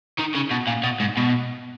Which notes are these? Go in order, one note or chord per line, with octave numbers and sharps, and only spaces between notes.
D#3
C#3
B2
A#2
B2
G#2
B2